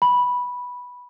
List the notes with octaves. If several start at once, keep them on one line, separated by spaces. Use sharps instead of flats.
B5